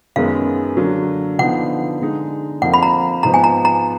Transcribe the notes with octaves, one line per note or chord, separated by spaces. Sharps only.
F#2 D#3 G#3 B3 F5
D3 F#3 A#3
D3 F3 B3 D#4 F#5
D3 G#3 D#4
F2 F3 A#3 F#5
B5
A#5
G#2 F3 B3 A#5
G#5
A#5
A#5